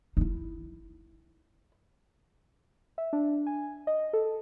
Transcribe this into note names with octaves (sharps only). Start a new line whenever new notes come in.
D#4 E4
E5
D4
G#5
D#5
A4